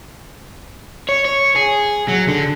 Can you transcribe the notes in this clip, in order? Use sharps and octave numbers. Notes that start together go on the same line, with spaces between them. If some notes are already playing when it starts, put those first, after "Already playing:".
C#5
C#5
G#4
F#3
D3